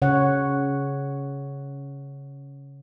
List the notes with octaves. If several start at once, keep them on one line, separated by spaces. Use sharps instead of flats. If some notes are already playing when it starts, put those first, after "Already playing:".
C#3 C#5 F#5